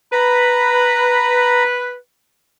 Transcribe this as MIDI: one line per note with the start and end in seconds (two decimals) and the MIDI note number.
0.12 1.94 71
0.12 1.64 82
0.12 1.64 83